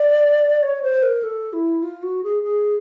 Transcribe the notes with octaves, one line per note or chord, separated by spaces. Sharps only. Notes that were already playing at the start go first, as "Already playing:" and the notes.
Already playing: D5
C#5
C5
A#4
A4
E4
F4
F#4
G#4
G#4